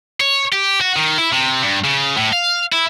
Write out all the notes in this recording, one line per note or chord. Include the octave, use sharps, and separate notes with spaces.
C#5
G4
F#4
D#3
E4
C3
G2
C#3
A2
F5
E4